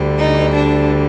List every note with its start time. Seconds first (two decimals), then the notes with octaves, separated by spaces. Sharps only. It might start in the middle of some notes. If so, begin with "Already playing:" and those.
Already playing: D2 D3 G3
0.19 D#4
0.54 D4